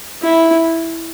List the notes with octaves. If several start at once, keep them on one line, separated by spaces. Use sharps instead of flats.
E4